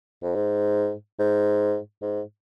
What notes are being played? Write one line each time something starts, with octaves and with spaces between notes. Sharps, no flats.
F2
G#2
G#2
G#2